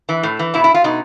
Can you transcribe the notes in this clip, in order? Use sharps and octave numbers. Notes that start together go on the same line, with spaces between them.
E3
A2
E3
B2 E4
E4
F4
B2 D#4